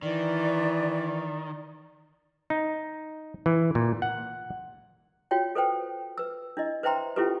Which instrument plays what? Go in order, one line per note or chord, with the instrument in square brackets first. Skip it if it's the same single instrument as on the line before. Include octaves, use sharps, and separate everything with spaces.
[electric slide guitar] D#3 [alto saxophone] E3 [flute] D5
[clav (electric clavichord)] D#4
E3
A#2
F#5
[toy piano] F4 F#4 C#5 G5
A4 B4 C5 G5
B4 E6
D4 E4 D#5
B4 C5 E5 G5 A#5 C6
C#4 E4 F4 G4 A4 B4